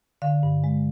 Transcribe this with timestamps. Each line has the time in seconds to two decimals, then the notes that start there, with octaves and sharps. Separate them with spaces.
0.22 D3 F5
0.43 G2
0.64 G#3